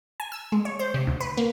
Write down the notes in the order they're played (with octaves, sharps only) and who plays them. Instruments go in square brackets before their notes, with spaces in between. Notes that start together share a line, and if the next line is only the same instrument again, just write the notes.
[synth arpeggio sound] G#5
E6
G#3
C#5
C5
C3
D2
B4
A#3